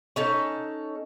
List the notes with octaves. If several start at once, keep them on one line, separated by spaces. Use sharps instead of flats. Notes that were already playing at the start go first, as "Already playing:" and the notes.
C#4 D#4 A4